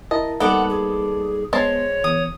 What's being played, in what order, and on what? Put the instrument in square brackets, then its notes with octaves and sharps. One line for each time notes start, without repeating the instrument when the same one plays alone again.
[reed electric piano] E4 A#4 A5 [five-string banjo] D#5
[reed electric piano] G3 A#3 D#4 [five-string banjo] B3 [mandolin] A4 D5 [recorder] F#5
[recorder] G#4
[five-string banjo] G#3 C5 A5 [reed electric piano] B3 [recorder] C#5
[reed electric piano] E3 B3 [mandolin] D#6